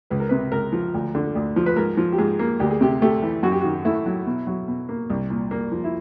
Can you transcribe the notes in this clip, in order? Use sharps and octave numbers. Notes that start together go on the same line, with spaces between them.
C#2 B4
A#4
C3 B4
C#2 A#4
F3
D2
D3
D2
F3
B4
G#2 A#4
F3
G4
G#2 G#4
A#3
D2 G4
G#4
C3 G4
A3 G4
E3
F#2 F#4
G4
D#3 F#4
A3 E4
F#3
B2
F#3
B2
A#3
C2
A#2
A#3
F3
E4